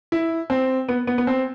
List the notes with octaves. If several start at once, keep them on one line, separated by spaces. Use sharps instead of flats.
E4
C4
B3
B3
B3
C4